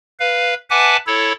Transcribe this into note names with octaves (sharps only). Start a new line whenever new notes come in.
B4 F5
B4 E5 F#5 G#5 A5 D6
E4 A4 C#5